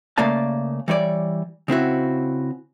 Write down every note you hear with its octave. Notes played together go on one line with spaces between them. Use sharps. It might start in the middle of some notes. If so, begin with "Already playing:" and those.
C#3 A3 A#3 D5 F5 A5
E3 G3 C#5 D5
C#3 C4 E4 F#4